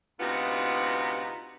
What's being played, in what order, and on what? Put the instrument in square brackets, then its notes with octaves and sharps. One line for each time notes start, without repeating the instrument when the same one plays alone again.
[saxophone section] D2 C3 B3 D#4 F4 F#5